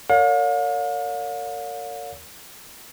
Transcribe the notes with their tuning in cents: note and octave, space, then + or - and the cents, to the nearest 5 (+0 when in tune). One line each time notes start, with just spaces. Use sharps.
A#4 -30 C#5 +35 F5 +40